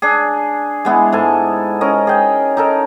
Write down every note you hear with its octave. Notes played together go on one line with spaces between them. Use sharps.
D4 G#4
G#3 B3 E4
G#2 A4 G#5
C#4 A#4 D#5
G#4 G5
D#4 A4 A#4